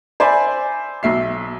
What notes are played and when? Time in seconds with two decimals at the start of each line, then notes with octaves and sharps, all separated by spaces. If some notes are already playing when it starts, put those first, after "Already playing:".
0.20 C5 D5 E5 G#5 B5
1.03 B1 E5 C7